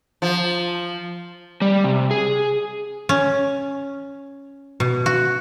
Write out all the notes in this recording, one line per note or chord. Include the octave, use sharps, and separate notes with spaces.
F3
G3
C3
G#4
C#4
B2
F#4